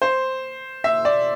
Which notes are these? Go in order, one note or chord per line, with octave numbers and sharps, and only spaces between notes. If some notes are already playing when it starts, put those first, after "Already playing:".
C5
E5
D5